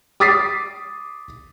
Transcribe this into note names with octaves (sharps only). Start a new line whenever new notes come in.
D6 D#6 A6 B6 C7